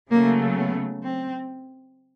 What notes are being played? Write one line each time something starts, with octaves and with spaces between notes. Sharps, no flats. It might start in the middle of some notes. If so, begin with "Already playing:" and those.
C#3 F#3 A3 A#3
B3
C4